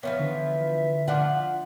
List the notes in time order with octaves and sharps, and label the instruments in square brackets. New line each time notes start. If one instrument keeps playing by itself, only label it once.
[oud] E3 F3 B3 [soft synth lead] C#5 [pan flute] E5
[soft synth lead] D3
[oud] F3 D4 [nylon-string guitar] F#5